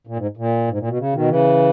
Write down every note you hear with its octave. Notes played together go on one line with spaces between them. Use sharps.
A#2
G#2
A#2
G#2
A#2
B2
C#3
B2 D#3
C#3 E3